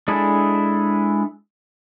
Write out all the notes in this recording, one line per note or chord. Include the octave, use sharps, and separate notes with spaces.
G#3 D4 E4 G#4 A4